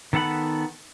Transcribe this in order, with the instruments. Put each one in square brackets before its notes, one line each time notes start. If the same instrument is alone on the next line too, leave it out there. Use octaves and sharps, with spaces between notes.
[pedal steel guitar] D#3 B3 A4 F#5 B5